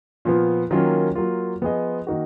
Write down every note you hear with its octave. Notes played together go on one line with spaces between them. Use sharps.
A#2 F3 B3
D#3 F#3 A#3 C#4 F4
F#3 A#3 F4
F3 B3 F4 G#4 D#5
D#3 A#3 D#4 F#4